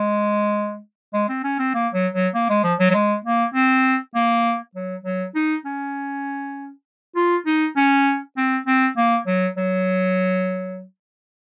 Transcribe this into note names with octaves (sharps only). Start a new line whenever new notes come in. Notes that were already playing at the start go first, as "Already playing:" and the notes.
Already playing: G#3
G#3
C4
C#4
C4
A#3
F#3
F#3
A#3
G#3
F3
F#3
F#3
G#3
A#3
C4
A#3
F#3
F#3
D#4
C#4
F4
D#4
C#4
C4
C4
A#3
F#3
F#3